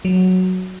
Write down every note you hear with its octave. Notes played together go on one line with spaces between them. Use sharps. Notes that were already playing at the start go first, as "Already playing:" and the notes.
F#3